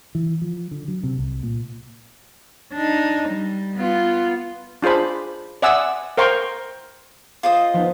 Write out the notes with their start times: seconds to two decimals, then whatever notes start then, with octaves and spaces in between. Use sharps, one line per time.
0.15 E3
0.42 F3
0.71 D3
0.88 F#3
1.03 C3
1.19 C2
1.43 A#2
2.73 D4 D#4
3.30 G3
3.76 B3 F4
4.83 D4 F4 G#4 C5 B5
5.62 D5 E5 F#5 G#5 D#6 E6
6.17 A#4 C5 F5 G5 C6 C#6
7.43 F4 C5 D#5
7.74 F3 B3 D#4